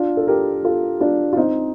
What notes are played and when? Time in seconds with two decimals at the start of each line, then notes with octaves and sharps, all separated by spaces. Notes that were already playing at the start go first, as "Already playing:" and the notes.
Already playing: D4 F4
0.17 A4
0.27 G4 A#4
0.64 F4 A4
1.01 D4 F4
1.33 F4
1.37 C4 D#4